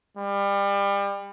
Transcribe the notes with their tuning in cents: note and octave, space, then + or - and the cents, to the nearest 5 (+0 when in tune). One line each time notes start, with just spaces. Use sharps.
G3 +30